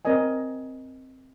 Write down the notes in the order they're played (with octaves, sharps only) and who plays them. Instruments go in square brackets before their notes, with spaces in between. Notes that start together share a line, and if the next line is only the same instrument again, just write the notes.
[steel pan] C4 A#4 D5 D#5 G#5